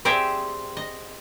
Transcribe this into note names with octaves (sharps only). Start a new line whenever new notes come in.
C4 G4 G#4 C5 D5 E5
D#5